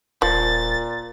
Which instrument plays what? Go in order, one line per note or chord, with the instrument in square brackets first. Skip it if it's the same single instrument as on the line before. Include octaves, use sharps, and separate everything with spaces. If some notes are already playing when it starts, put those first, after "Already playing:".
[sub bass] D#1 [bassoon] A#2 [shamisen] F3 [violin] A6